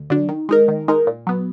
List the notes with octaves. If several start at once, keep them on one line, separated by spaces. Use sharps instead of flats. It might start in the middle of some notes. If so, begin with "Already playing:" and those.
Already playing: D2
D3 F#3 D4
D#3
G#3 D#4 A#4
D#3
G#3 D#4 A#4
A#2
F#3 B3